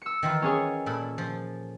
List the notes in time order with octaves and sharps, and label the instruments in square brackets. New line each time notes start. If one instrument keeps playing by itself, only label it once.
[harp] E6 C#7
[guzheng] D#3 E3 F4
[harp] C#4 G#4 C#5
[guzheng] A#2 A4 B5
F3